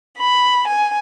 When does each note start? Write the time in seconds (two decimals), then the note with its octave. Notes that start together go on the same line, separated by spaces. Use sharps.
0.17 B5
0.65 G#5